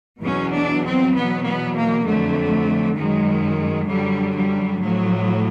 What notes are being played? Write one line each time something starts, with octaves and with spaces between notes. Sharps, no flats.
E2 B2 F#3 C#4
D4
C4
E2 B2 F#3 B3
B3
A#3
F2 D3 F#3 A3
F#2 D#3 F#3 G#3
F#2 D3 F#3 G3
G3
A2 F3 F#3